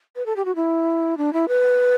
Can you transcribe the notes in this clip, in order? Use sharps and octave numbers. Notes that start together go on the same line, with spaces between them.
B4
A4
G4
F#4
E4
D4
E4
B4